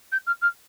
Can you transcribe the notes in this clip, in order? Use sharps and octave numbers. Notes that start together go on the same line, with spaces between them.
G6
F6
F6